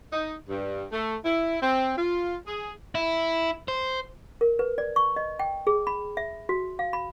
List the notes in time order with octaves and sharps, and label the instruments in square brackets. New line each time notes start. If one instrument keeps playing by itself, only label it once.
[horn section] D#4
G2
A3
E4
C4
F4
G#4
[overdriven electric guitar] E4
C5
[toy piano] A#4
B4
D5
C#6
D#5
G5
G#4
B5
E5
F#4
F5
B5